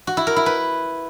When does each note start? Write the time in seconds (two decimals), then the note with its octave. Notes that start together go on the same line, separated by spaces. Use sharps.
0.07 F#4
0.17 E4
0.27 A#4
0.36 E4
0.46 B4